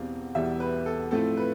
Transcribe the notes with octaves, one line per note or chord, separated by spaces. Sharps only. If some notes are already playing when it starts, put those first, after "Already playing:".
Already playing: E1 E2 B2 G3 C4 F5
E1 E2 B2 G3 E5
B4
A4
A2 F3 A3 C4 A4
B4